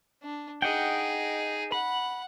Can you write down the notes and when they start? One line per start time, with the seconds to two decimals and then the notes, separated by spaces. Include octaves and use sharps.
0.22 D4
0.62 D#4 G#4 D#5 F#5 G5
1.72 F#5 B5